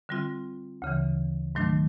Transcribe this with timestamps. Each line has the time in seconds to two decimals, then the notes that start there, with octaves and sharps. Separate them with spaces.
0.09 D3 G3 C4 F4
0.82 D2 C#3 E3
1.55 G#2 D#3 F#3 A3 D4